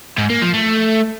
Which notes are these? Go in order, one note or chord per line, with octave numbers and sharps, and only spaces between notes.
G#2
A#3
F3
A3